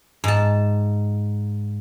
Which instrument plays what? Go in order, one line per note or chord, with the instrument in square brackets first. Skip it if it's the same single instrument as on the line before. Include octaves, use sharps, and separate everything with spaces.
[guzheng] G#2 A5